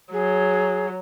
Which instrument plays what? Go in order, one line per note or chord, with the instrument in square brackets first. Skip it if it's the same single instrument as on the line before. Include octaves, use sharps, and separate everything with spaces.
[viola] F#3 [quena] G#4